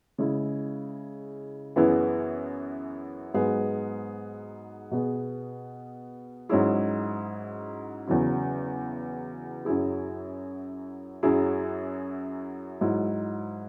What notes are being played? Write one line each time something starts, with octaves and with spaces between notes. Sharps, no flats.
C#3 G#3 E4 G#4
F#2 E3 B3 E4 G#4
G#2 F#3 B3 G#4
B2 B3 G#4
G#2 F#3 C#4 E4 G#4
E2 C#3 F#3 E4
F#2 F#3 E4 G#4
F#2 F#3 E4 G#4
G#2 F#3 E4